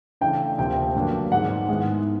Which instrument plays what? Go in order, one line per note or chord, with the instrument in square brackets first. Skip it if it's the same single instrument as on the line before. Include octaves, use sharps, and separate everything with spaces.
[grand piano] C#3 E3 A3 D4 [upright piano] G5
[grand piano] D2 C3 F3 A#3 [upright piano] G5
[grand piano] G2 D3 F#3 A#3 D4
[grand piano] G#2 D#3 G#3 C4 [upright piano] F#5
[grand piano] G#2 D#3 G#3 B3 E4